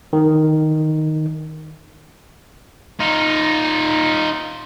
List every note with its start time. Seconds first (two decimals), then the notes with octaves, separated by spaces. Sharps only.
0.13 D#3
3.00 D#4 F4